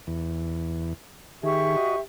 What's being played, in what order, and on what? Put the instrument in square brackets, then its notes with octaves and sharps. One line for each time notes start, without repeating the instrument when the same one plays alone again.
[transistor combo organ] E2
[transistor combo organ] D#3 G#4 [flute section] G4 E5 C#6
[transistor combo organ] F#4 D#5